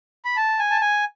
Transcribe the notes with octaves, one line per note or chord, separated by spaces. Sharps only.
B5
A5
G#5
A5
G#5